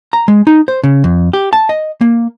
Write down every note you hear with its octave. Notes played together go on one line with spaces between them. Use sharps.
A#5
G#3
D#4
C5
C#3
F2
G4
A5
D#5
A#3